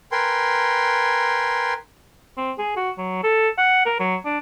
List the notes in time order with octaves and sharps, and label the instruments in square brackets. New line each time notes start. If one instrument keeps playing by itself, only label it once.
[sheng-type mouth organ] A#4 B4 G5 G#5 C6
[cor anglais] C4
G#4
F#4
F#3
A4
F#5
A#4
F#3
D4